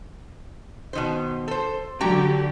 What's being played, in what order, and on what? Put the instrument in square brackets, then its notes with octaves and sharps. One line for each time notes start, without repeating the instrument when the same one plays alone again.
[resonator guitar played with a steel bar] B2 D#3 C5
A4 C5
[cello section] D3 F#3 G4 [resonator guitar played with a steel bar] F#4 G5 A#5